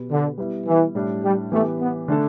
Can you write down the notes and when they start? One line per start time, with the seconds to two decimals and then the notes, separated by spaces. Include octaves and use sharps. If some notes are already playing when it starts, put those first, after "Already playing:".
Already playing: B2 B3 G4 B4
0.10 D3
0.38 G3 B3 E4 B4
0.66 E3
0.95 A2 G3 D4
1.23 G3
1.52 E3 A3 B3 G4
1.80 B3
2.08 D3 A3 D4 A4